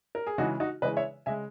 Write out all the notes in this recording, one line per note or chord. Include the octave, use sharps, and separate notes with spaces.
A#4
G#4
C#3 E3 G#3 D#4 F#4
D#4 F#4
C#3 E3 G#3 B4 D#5
C#5 E5
C#3 G#3 E5 G#5